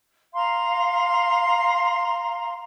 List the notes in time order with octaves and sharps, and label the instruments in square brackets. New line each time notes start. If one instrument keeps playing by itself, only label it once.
[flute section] F5 A#5 C6